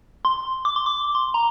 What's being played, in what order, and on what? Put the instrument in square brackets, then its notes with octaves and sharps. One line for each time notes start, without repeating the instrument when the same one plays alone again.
[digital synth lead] C6
D6
C6
D6
C6
A#5